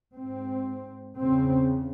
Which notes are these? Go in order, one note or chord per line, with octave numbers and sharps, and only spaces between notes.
G#2 C4
E2 C#3 C4